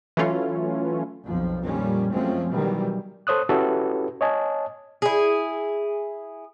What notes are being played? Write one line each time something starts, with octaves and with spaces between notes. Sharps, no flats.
E3 F#3 A3 C#4 F4
B1 F2 F3
F2 A#2 D#3 F3 G3 C#4
F#2 F3 G#3 A3 C4 C#4
B2 D#3 E3 F#3 G3
A4 C5 C#5 D#6 F#6
C#4 E4 F#4 G4 A4 B4
C#5 D#5 G#5 A5
E4 G#4